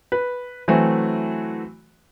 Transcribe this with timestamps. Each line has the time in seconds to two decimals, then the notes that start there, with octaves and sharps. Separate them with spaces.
0.12 B4
0.68 E3 F#3 A3 C4 F#4